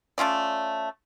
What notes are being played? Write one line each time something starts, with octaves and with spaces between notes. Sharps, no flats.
A3 C#4 F4 D5